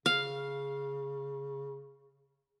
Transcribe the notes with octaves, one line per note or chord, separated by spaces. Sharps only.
C#3 F5